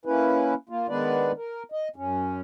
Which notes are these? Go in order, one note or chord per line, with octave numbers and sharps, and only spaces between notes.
A#3 C#4 E4 B4
A#3 F4
D#3 G#3 B3 D4 B4 D5
A#4
D#5
F#2 C#4